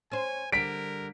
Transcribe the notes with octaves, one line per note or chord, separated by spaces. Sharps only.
C#4 C5 G#5
D3 G3 A#4 B6 D7